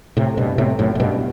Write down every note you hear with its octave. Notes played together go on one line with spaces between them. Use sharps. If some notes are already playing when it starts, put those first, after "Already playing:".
A2 C3
G2 B2
A2 C3
F#2 A2
A2
G2 B2